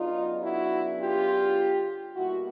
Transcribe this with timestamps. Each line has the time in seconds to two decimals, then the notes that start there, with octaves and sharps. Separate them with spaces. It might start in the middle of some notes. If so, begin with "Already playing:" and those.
Already playing: C#3 F#3 B3 D4 D#4 F4
0.43 E4 F#4
1.00 F4 G4
2.16 B2 G3 A#3 E4 F#4